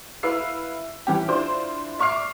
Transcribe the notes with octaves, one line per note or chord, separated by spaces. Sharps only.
E4 B4 E5 F5 E6 C7
E3 C#4 G4
D4 E4 F4 C5
D5 E5 C#6 D6 F6 C7